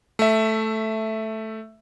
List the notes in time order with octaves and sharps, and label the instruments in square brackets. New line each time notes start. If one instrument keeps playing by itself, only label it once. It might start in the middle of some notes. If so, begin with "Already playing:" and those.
[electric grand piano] A3 E5